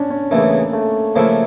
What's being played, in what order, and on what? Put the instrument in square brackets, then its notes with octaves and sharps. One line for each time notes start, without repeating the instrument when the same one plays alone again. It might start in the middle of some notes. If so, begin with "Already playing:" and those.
Already playing: [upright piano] C#4 D4
C#4
[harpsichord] E2 C#3 E3 A3 [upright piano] A#3
[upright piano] A3
[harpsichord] C#3 F3 A3 E4 [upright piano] A#3